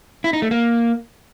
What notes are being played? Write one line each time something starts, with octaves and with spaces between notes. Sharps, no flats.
E4
D#4
A3
A#3